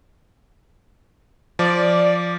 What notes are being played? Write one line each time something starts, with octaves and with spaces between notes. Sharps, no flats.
F3 D5